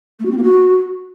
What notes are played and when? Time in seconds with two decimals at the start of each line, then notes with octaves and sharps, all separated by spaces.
0.19 A3
0.25 F#4
0.31 C4
0.37 A#3
0.43 F#4